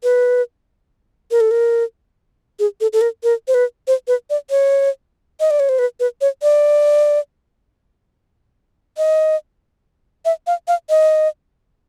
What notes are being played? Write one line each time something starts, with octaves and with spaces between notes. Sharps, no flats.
B4
A#4
A4
A#4
G#4
A4
A4
A#4
A#4
C5
B4
C5
B4
D5
C#5
D#5
D5
C#5
C5
B4
B4
C#5
D5
D#5
E5
F5
F5
D#5